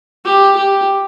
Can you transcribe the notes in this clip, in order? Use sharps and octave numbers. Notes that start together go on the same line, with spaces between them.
G4
G4